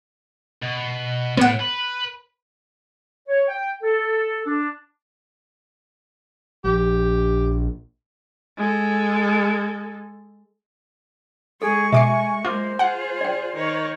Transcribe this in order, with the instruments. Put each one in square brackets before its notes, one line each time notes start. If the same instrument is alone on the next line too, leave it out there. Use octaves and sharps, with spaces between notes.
[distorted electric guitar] B2
[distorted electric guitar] A2 [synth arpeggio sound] B3 F#5
[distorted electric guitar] B4
[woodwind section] C#5
G5
A4
D4
[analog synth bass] A#1 [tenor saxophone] G4
[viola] G#3 A4
[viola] G#3 C#6 [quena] G#4 [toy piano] A4
[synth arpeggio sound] B2 D6 C7 [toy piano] E5 [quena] G#5
[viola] G#3 A#3 [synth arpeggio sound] F4 [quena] C5 [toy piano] D6
[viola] F4 G#4 [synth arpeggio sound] F#5
[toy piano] D5 G5
[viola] D#3 C#5